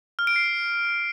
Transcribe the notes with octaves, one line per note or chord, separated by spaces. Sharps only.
F6
D7
C7